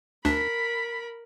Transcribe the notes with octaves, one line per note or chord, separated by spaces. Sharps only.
D2 D4 A#4 B5 B6